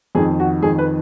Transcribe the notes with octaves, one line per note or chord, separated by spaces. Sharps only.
F2 D#3 G#4
F#4
F2 D#3 G#4
B4